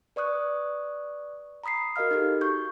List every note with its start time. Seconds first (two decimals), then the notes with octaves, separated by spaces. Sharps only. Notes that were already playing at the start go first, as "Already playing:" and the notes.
0.16 B4 D5 C#6 D#6 F#6
1.64 A#5 B5 D#6 B6 C7
1.96 F#4 A#4 D#5 F5 F6
2.11 D#4 F#4 G4 A4
2.41 C#6 G6